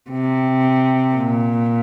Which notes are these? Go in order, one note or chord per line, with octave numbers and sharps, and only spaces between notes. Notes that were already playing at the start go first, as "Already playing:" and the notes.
C3
A#2